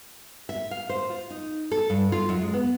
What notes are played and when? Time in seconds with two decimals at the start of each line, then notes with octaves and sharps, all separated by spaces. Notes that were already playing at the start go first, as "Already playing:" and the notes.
0.49 E5
0.71 F5
0.90 C5
1.10 F4
1.30 D#4
1.72 A4
1.90 G2
2.12 F4
2.29 F#2
2.42 G#3
2.53 B3